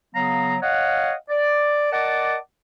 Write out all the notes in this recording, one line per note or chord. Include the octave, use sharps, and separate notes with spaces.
C#3 F#3 B3 F5 A#5
C#5 D#5 F5 F#5
D5
A#4 D5 D#5 F#5 A5 D6